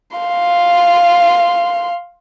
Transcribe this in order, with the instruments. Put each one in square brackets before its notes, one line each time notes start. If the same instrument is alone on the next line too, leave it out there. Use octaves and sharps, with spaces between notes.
[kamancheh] F5 C6